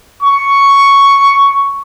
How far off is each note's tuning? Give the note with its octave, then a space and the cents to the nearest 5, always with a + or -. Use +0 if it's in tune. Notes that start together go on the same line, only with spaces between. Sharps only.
C#6 +5